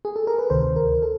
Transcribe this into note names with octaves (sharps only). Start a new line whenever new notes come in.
G#4
A4
A#4
B4
D2 C3 D#3 C5
A#4
A4